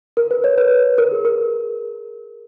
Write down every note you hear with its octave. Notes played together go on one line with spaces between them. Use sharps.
A#4
B4
C#5
B4
A#4
G#4
A#4